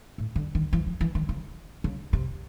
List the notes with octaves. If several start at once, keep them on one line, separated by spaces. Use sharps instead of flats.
A2
D3
D#3
E3
F3
E3
D#3
C#3
C#3
C3